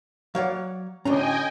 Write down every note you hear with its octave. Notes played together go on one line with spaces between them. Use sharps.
F#3 C#5 D5 F5 F#5
D2 A2 C#4 D5 D#5 G5 G#5 A#5